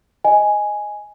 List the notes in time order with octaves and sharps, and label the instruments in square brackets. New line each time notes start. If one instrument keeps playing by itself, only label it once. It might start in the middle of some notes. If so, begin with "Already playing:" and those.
[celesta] D#5 G#5